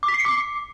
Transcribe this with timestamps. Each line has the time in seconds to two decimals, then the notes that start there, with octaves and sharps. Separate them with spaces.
0.03 D6
0.08 B6
0.14 C7
0.19 C#7
0.25 D6